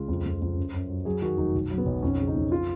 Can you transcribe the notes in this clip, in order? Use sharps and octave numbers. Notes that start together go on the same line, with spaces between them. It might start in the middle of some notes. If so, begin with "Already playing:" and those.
Already playing: C#2 F4
F2
F2
F2
F#2
F#2
F#3
F#3 G#4
D#3 F#4
F1 D#4
B1
F#3
B3
B1
F2 C#4
C#3
D#4
F2
F4